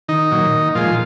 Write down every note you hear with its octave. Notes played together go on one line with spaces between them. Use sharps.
D#3 D#4
A#2 F#3
A#2 F3 G#3 F4